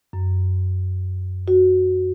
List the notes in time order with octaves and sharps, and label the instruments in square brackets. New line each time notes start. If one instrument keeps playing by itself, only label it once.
[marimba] F#2
F#4